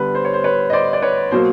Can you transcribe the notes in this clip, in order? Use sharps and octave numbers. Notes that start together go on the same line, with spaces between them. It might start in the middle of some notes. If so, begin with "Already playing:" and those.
Already playing: D3 G3 B3 B4
C5
C#5
C5
B4 C#5
D#5
C5 D5
D5
B4 C#5
B2 F#3 A#3 C5